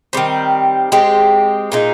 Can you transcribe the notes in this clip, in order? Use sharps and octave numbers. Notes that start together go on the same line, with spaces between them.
D#3 G3 C4
G#3 C4 G4
A#2 G#3 D#4